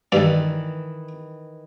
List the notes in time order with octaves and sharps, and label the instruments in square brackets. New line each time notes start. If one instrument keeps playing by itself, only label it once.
[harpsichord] G2 A4 [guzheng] D#3 E3